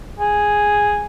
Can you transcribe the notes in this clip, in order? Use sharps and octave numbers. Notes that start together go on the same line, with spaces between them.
G#4